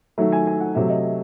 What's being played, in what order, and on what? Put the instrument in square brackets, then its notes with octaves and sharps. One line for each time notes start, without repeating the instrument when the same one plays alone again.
[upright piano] D#3 F#3 A3 E5
G#5
G#5
F#5
C3 F#3 A3 E5
D#5